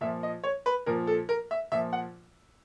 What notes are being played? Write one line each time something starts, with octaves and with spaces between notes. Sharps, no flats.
A#2 F3 E5
D#5
C#5
B4
A#2 F3 A#4
A4
A#4
E5
A#2 F3 E5
F#5